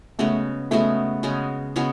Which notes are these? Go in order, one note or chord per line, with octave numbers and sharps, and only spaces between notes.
C#3 G#3 A3 B3 F#4
C#3 G#3 A3 B3 F#4
C#3 G#3 B3 F#4
C#3 G#3 B3 F#4